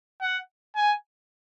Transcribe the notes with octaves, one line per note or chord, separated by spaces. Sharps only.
F#5
G#5